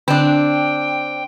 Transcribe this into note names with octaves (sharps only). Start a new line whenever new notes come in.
D3 C4 D4 G5